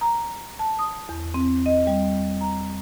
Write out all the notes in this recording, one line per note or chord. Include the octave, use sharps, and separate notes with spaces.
A#5
A5
D#6
E2
C4
D#5
G3
A#5